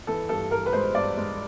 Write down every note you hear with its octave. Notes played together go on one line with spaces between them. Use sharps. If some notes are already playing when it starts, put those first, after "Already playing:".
E3 A4
G2 A4
G2 A#4
B4
G#3 C5
G2 D5
G#3